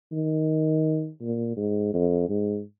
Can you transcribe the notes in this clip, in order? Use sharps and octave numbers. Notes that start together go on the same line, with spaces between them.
D#3
A#2
G#2
F2
G#2